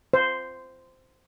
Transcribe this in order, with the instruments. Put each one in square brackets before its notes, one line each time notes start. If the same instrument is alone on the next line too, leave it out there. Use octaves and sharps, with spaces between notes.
[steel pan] C5